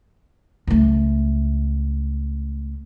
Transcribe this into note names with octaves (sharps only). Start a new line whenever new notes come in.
C#2 A3